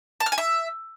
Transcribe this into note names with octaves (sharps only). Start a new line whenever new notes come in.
A5
F6
G#5
E5